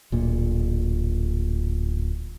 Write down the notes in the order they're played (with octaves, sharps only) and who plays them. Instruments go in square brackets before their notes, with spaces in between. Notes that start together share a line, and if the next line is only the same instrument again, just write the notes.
[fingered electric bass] D1 A#2